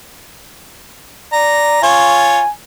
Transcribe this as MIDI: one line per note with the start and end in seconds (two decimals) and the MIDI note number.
1.33 1.83 74
1.33 1.82 82
1.83 2.40 65
1.83 2.40 73
1.83 2.51 80